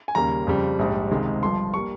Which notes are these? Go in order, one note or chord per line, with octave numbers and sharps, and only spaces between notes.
G#5
D#2 C#3 G3 A#3 A#5
F2 C#3 G3
A#1 G#2 G3
C#2 C3 D#3 G#3
G1 G2 F3 C6
G3 A#3 C#6